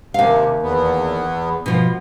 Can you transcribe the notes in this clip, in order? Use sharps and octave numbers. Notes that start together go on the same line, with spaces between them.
D#2 C3 F5
E2 B3
B2 F3